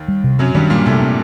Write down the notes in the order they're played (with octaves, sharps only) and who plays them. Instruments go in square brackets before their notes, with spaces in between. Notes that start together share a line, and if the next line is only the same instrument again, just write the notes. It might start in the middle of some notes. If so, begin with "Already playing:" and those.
Already playing: [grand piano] D#2 D#3
[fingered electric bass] G3
C3
[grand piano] F#2 F#3 [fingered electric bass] C4
[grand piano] G2 G3 [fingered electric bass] D#3
[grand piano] A#2 A#3 [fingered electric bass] G3
[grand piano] A2 A3 [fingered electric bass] C3
[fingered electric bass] C4